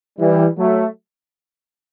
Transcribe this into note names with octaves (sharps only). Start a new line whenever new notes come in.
E3 G3
F#3 A3